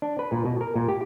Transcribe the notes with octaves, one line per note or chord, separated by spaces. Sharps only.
D4
B4
A#2
B2
A#4
A#2
G4